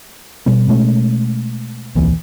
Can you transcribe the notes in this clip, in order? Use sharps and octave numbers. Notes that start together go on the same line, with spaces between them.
B2 G3 B3
B2 G#3 A3 C#4
D#1 C2 E3 A#3